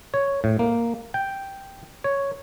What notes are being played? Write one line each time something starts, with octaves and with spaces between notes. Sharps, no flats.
C#5
A2
A#3
G5
C#5